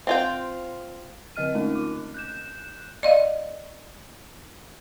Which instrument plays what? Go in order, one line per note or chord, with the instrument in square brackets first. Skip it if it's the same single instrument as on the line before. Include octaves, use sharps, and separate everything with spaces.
[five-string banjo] C4 F4 G5
[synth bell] D3 C4 D#5 F6 D#7
G#3 A3 C#4 D#4 F4 A#4
D6
F#6 G6 E7
[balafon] D5 D#5 F5